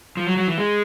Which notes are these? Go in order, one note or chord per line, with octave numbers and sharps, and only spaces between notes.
F3
F#3
F#3
E3
G#3